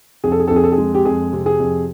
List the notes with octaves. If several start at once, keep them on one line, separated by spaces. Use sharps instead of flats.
F2 G#4
A4
G#4
A4
F2
G#4
A4
G#4
G#3
G4
F2 G#4
C3
G#4
F2